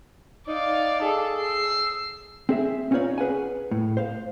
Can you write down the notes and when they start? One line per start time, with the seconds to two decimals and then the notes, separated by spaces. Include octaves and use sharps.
0.48 D#4 D5 F5
1.02 G#4 A4
1.41 E6 C7
2.49 C4 G#4 E5
2.91 C4 C#4 D#4 F4 C#5 D5
3.18 G#4 B4 F#5 G#5
3.71 A2
3.97 C5 F5